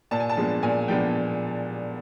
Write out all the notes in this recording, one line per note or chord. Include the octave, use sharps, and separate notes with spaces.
A#2 A5
G#5
A5
F3 G#3 B3 D4
A#2 G#5
F3 G#3 B3 D4 G5